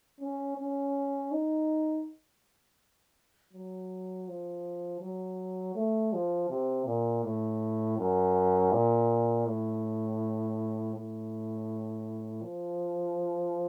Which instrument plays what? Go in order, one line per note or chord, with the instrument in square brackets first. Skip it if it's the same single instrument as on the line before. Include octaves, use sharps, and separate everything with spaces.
[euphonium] C#4
C#4
D#4
F#3
F3
F#3
A3
F3
C3
A#2
A2
F#2
A#2
A2
A2
F3